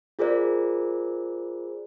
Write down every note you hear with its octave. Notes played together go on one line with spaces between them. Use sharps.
F4 G#4 A#4 C5 D5